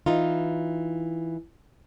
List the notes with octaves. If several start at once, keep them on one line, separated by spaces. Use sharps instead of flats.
E3 D#4 F4